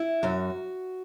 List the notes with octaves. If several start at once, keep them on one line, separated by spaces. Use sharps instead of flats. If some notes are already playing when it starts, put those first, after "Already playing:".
Already playing: E4
F#2 F#4